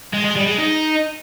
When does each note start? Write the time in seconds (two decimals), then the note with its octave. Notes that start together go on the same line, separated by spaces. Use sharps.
0.14 G#3
0.25 G#3
0.36 G3
0.47 G#3
0.58 D#4